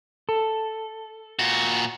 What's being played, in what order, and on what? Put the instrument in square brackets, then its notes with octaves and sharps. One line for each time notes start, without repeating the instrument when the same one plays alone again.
[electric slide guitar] A4
[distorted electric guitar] A#2 F#4